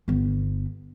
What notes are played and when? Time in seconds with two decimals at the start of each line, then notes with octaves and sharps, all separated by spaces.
0.08 G1 B3